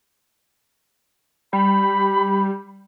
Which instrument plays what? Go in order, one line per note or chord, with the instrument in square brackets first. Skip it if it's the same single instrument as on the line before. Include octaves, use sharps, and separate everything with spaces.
[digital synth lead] G3 [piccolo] B5